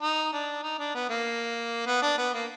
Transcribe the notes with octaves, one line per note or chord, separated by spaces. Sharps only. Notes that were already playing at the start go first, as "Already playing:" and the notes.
D#4
D4
D#4
D4
B3
A#3
B3
D4
B3
A#3